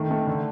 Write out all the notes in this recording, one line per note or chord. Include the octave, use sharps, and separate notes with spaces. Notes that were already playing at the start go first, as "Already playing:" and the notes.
Already playing: D#3 A3
A3
D3